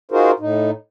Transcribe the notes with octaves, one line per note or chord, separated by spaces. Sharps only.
D#4 F4 F#4 G#4 A#4 C5
A2 D#4